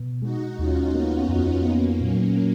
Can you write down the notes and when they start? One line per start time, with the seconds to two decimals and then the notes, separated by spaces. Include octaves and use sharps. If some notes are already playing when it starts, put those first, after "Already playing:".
Already playing: B2
0.22 G#3 D#4 F#4
0.58 D#2 C#4 F4
0.94 A#3 B3 D#4
1.29 F2
1.65 A#3 B3 C#4
2.00 A#2 F#3 A#3
2.37 A#3